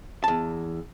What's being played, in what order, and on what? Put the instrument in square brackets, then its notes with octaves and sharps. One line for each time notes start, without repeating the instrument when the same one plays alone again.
[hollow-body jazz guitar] E2 A5